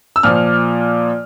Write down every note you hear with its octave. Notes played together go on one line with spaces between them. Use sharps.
E6
A#2 F3 F6